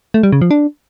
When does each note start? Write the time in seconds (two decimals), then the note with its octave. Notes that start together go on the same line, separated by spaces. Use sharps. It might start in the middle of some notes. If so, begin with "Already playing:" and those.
0.14 A3
0.23 G3
0.32 C#3
0.42 F3
0.51 D4